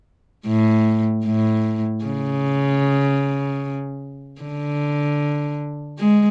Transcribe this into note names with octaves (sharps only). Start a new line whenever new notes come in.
A2
A2
C#3
D3
G#3